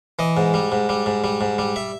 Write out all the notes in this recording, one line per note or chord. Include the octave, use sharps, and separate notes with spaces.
E3 D#5
G#2
G3
G#2
G3
G#2
G3
G#2
G3
E5